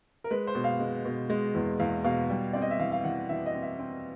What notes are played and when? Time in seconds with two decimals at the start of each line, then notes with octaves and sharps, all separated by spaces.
0.24 A#4
0.30 G#3 B4
0.47 C5
0.55 B2
0.64 F5
0.80 G#3
1.05 B2
1.30 G#3
1.55 E2
1.79 E2 F5
2.04 B2 F5
2.30 G3
2.53 C4 D5
2.62 D#5
2.71 E5
2.79 E3 F5
2.92 F5
3.04 E3 F#5
3.29 E3 E5
3.46 D#5
3.54 C4
3.62 E5
3.79 C4